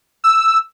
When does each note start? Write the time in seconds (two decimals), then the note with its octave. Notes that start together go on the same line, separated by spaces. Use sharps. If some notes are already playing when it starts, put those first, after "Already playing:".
0.24 E6